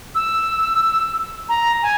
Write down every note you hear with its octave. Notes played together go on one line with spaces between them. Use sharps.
E6
A#5
G#5